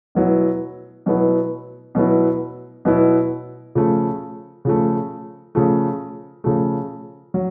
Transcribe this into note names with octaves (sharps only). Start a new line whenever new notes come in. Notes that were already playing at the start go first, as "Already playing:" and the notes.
B2 F#3 B3 E4
B2 F#3 B3 E4
B2 F#3 B3 E4
B2 F#3 B3 E4
C#3 F3 A3
C#3 F3 A3
C#3 F3 A3
C#3 F3 A3
F#3